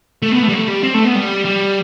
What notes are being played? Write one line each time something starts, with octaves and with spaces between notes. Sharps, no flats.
A3
B3
A3
G3
A3
G3
C4
A3
B3
G3
G3